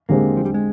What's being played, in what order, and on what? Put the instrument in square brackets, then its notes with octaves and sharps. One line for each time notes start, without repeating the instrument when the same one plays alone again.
[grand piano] D3 G#3 C4 G4 [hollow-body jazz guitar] A#3
[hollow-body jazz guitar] F3
G3
G#3